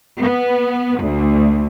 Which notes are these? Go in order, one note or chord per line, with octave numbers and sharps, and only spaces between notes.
B3
D2